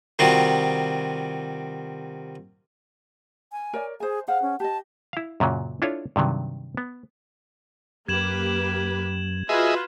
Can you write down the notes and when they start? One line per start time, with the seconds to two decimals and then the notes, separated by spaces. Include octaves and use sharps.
0.19 C3 D#3 G3 F4 F#4
3.52 G#5
3.73 A#4 C#5 D5
4.00 G#4 C5 G#5
4.28 G#4 C5 F5 F#5
4.42 C#4
4.60 G4 D#5 A5
5.13 E4 F5
5.40 F#2 A#2 C#3 F#3
5.82 D4 E4 F4 A4 C#5
6.16 G2 C3 D#3 F#3
6.77 B3
8.08 F#2 A#3 G4 B4 G#6 E7 F#7
9.49 F4 F#4 G#4 B4 D#5 E5